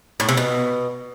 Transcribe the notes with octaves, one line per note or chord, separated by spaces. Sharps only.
A2
C3
B2